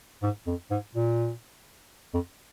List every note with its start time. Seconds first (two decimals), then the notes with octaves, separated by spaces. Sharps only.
0.23 G#2
0.47 F2
0.71 G#2
0.95 A#2
2.14 F2